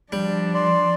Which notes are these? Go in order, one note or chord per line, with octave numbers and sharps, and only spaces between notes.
F3 G3 D4
D5 C6